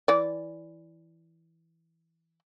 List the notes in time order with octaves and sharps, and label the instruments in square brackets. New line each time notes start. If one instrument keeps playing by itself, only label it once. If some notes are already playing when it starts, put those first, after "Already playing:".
[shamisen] E3 D5